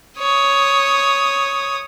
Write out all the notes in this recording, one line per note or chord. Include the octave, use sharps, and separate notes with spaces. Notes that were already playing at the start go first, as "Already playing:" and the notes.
C#5 D#6